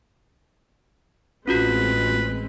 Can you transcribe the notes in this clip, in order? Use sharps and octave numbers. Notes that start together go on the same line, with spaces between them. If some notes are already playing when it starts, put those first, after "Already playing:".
A1 G#3 C4 C#4 F4 F#4 B4